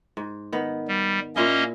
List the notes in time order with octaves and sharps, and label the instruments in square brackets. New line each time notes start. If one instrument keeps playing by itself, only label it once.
[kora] G#2
D#3 B3
[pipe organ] G3
[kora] A#2 E4 G#4 [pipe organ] A#3 C#4 D#5